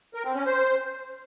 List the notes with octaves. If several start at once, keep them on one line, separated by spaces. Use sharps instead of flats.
A#4
C4
C#4
C5